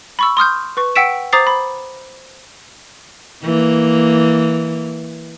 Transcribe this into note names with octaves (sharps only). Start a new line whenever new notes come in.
B5 C#6 E6
C6 D#6 F6 G6
B4 C#6
F#5 G5 E6 B6 D7 E7
C5 A#5 D6 D#6 A6 C7
B5
E3 A#3